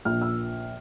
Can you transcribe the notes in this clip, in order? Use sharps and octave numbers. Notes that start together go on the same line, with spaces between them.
A#1 F6
E6